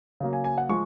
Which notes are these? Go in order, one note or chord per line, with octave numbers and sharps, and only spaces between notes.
C#3 F#3 A#3
G#5
G#5
F#5
F3 G#3 C#6